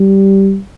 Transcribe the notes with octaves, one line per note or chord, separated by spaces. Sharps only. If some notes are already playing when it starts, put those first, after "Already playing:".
Already playing: G3